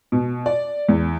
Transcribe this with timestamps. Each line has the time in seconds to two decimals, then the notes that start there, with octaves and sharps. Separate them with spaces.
0.12 B2
0.46 D5
0.89 E2